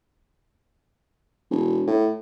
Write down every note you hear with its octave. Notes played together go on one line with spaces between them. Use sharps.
E1
A2